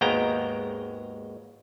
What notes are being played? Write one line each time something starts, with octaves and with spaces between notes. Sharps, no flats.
G#1 D#2 G#3 B3 G5 A#5